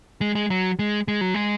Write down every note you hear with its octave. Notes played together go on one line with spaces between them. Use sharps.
G#3
G#3
F#3
G#3
G#3
F#3
G#3